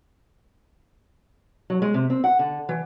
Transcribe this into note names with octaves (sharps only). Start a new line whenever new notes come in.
F#3
G#3
C3
C4
F#5
D3
E3